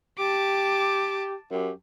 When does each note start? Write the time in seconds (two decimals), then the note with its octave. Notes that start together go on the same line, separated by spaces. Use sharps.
0.18 G4 A5 D6
1.51 F#2 G4